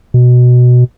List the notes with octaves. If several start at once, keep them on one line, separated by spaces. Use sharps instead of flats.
B2